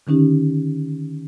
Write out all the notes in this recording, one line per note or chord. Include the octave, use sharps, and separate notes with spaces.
D3 D#3 C#4 D#4 G4